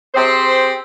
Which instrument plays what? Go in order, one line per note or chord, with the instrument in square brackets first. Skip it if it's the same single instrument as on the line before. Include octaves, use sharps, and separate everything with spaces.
[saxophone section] C4 G4 G#4 C5